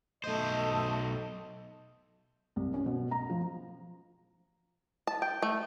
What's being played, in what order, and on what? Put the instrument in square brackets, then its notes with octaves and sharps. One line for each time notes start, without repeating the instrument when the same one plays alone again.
[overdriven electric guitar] B1 C5 [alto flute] A3 [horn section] D#5
[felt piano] C2
C#4
B2
A#5
F3
[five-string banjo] A5
G5
A3